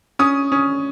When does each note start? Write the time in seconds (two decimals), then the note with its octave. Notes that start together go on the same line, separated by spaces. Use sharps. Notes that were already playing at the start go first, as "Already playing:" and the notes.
0.19 C#4 D#6
0.52 C#4